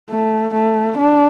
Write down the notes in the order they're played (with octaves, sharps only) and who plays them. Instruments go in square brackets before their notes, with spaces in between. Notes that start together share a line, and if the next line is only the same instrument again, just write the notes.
[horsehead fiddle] A3
A3
D4